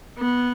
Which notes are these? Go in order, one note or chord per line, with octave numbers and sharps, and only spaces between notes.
B3